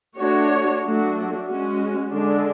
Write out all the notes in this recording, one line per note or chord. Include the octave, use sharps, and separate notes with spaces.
A3 D4 F#4 C#5
F#3 A3 D4 F#4
G#3 C#4 F#4
D3 G#3 D4